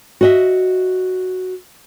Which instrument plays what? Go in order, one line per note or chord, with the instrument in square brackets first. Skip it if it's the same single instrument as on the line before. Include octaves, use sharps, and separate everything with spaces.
[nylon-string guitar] F#4 D#5 E5